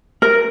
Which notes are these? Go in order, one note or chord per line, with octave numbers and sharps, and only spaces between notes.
A#4